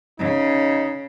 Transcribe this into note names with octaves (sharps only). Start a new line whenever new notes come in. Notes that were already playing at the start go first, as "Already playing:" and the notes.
C#3 D#4